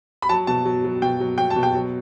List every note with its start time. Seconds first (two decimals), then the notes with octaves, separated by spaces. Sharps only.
0.22 B5
0.29 F#3 A5
0.47 B2 A5
0.65 F#3
0.84 F#3
1.02 B2 G5
1.20 F#3
1.38 F#3 G5
1.50 A5
1.56 B2
1.63 G5
1.74 F#3